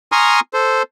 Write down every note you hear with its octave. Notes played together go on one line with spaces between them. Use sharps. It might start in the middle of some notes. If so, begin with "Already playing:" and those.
G#5 A#5 C6 C#6 D#6 F6
A4 C5